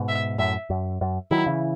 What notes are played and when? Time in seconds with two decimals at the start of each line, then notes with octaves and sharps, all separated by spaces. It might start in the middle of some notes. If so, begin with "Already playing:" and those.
Already playing: G#2 B2
0.08 E5
0.38 F#2 A2 E5
0.70 F#2
1.01 F#2
1.31 D#3 F#3 E4
1.46 C#3 E3